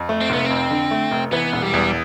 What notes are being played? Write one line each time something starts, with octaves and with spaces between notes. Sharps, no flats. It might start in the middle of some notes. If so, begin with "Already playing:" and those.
Already playing: F2
A3
C4
F1 B3
C4
F2
D3
A3
F1
E3 B3
E1
G3
E2